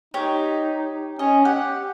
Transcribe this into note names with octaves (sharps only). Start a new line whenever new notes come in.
D#4 G4 C#5
C#4 D#5
G4 F#5